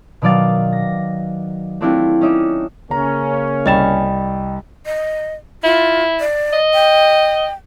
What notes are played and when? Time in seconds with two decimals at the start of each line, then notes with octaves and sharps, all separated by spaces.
0.22 B2 D#3 F#3 D5 F5 A6
0.73 A#6
1.81 A3 C4 D4 E4 F4 G4
2.21 C#4 D#4 E5 D6
2.91 C#3 A#3 C#4 A#5
3.66 C2 D#5 G5 B5 A6 E7
4.86 D#5
5.63 E4 F4
6.20 D5
6.53 D#5
6.74 G5